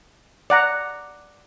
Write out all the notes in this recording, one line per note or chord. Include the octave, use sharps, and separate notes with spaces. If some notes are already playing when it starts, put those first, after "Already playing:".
D5 F#5 A#5